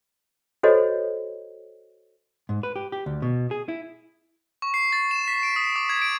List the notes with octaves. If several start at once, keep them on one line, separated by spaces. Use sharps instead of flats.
F#4 A4 C5 C#5 D#5
G#2
B4
G4
G4
D2
B2
G#4
E4
C#6
C7
A6
E7
B6
D7
D#6
D6
G#6
D7